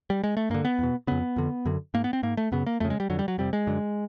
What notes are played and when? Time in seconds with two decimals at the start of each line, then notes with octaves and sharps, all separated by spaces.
0.10 G3
0.24 G#3
0.37 A3
0.50 G2 D3 A#3
0.65 B3
0.79 E2 B2
1.07 F2 C#3 B3
1.36 F2 D3
1.66 F#2 D3
1.94 G#2 A#3
2.04 B3
2.13 C4
2.23 G#2 A#3
2.37 A3
2.52 F#2 C#3 B3
2.67 A#3
2.80 F2 C#3 A3
2.90 G#3
3.00 G3
3.10 F2 D3 F#3
3.19 G3
3.28 F#3
3.38 F2 C3 G3
3.53 G#3
3.67 F#2 D3